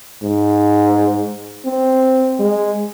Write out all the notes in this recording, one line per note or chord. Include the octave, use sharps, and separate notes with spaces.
G#2
C4
G#3